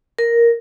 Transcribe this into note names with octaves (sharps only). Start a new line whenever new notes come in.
A#4